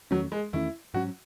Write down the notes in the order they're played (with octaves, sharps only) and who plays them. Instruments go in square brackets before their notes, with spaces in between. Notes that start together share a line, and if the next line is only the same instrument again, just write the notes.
[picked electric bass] E2 D#3 A3 C#4 [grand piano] F#3
[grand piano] G#3
[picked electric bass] E2 D#3 A3 C#4 [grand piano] E4
[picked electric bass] G#2 F#3 C#4 [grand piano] F#4